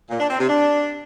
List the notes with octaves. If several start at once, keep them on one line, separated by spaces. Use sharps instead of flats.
A#2
D4
C4
C3
D4